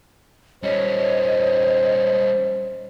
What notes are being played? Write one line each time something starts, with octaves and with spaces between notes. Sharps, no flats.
G3 C#4 C5 C#5 D#5